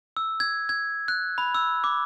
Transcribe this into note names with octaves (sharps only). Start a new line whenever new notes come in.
E6
G#6
G#6
F#6
B5
E6
D6